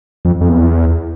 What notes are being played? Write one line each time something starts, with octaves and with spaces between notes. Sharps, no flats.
F2
F2
E2